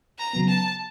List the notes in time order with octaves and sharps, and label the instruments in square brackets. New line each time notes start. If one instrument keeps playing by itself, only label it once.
[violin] A#5
[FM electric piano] C#3 F#3 B3
[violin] A5